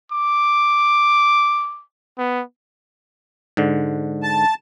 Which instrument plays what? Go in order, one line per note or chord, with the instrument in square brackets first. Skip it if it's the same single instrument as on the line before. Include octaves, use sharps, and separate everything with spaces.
[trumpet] D6
B3
[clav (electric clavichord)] G#2 D3
[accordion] A5